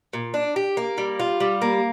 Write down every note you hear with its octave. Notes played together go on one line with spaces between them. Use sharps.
A#2
D4
G4
A#3
G3
F4
G3
A#3